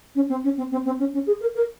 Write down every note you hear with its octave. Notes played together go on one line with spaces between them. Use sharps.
C#4
C4
C#4
C4
C4
C4
C#4
C#4
G#4
A#4
A#4